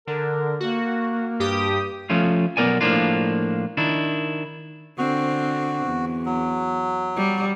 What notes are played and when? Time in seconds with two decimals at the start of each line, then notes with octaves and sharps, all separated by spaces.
0.07 D3 A#4
0.60 A#3 F#4
1.40 G2 G4 D#6
2.10 F3 A3 C#4 F4
2.57 B1 B3 A#4 D5 G#5
2.81 A2 F3 A#3 D4 F4
3.77 D#3 D4 E4
4.98 D3 C4 F#4
5.86 E2
6.26 F#3
7.16 G3